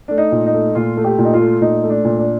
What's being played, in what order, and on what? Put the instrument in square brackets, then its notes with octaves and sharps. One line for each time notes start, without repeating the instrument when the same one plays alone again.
[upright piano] A3 D4
D#4
A#2
D#4
A3
A#2 F4
A3
G4
A#2
D#4
F4
A3
A#2 D#4
A3
D4
A#2
D4